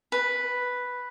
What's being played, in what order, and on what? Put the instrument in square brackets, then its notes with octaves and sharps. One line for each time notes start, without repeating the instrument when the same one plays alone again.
[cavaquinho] B4